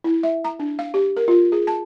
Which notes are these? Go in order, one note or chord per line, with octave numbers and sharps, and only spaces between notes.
E4
E5
A#5
D4
F5
G4
A#4
F4
G#4
A5